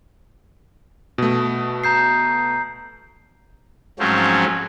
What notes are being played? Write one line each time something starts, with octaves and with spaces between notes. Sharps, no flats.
B2 A3
A#5 G6 C7
G#2 F3 F#3 A3 C4 C#4